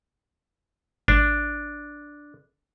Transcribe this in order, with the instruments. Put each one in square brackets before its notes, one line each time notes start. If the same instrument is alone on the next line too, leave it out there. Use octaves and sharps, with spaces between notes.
[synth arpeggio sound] G#1 [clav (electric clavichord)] D4